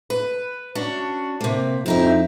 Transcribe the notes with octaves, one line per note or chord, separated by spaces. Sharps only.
B4
C#4 D4 F#4
C3 A#3
F2 C4 D#4 E4